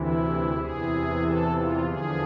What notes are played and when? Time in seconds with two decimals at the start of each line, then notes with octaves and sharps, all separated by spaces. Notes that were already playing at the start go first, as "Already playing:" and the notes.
Already playing: D2 C3 E3 E4
0.55 E2 C3 E3 G#4
1.20 A4
1.53 F4
1.84 E2 D3 F3 G#4